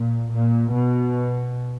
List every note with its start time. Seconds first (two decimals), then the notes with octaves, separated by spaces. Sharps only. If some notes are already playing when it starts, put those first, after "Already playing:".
Already playing: A#2
0.32 A#2
0.72 B2